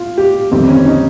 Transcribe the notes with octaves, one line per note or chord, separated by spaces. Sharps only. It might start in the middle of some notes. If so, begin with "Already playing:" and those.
Already playing: F4
G4
G1 F2 D#3 G3 C4
C#4
D#4